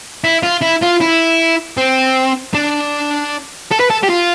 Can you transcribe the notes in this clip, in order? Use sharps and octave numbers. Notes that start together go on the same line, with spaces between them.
E4
F4
E4
F4
E4
C4
D4
A4
B4
A4
G4
F4